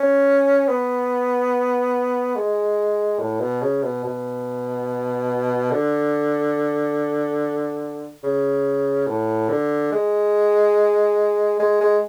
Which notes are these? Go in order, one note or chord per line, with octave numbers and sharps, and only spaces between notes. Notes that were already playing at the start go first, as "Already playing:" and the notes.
Already playing: C#4
B3
G#3
A2
B2
C#3
B2
B2
D3
C#3
A2
D3
G#3
G#3
G#3